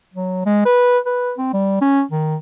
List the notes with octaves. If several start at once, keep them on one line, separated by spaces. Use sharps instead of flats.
F#3
G#3
B4
B4
C4
G3
C#4
D#3